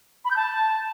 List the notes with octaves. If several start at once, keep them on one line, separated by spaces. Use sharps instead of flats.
B5
G6
A5